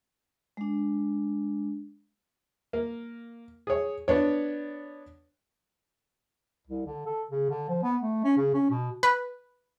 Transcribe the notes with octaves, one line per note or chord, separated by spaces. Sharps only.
G#3 D4
A#3
G#4 C#5
B3 D4 C#5
C2
D3
A4
C#3
D3
F3
B3
A3
C#4
C#3
C#4
B2
B4